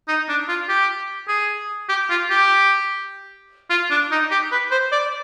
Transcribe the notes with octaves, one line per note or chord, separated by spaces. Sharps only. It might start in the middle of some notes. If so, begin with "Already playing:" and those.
D#4
D4
F4
G4
G#4
G4
F4
G4
F4
D4
D#4
G4
B4
C5
D5